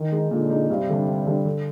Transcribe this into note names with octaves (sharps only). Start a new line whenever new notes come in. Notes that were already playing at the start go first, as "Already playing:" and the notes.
Already playing: D#3
G#3 D#4
A#2 D3
G#3 D#4
G2 C3
D3 G3 D4
G2
D3 G3 D4
D3